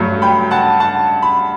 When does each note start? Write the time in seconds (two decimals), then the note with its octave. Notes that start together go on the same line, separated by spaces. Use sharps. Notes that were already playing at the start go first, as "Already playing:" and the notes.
Already playing: G2 F#3 A3
0.22 G5 B5
0.51 F#5 A5
0.80 F#5 A5
1.22 B5